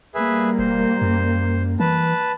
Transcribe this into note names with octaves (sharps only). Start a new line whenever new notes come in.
G3 A#3 G#4 B4 E5
E1 C5
F#2
E3 B4 A5